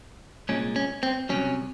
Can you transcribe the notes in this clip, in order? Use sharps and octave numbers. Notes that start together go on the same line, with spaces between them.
C2 A#2 G#3 C#4
C#4
C4
C2 C3 F#3 C#4